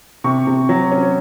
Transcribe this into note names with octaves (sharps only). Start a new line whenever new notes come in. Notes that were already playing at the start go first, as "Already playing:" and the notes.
C3 C#6
C3
F#3
C#4